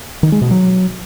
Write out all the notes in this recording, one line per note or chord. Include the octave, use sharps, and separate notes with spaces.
D#3
G#3
B2
F#3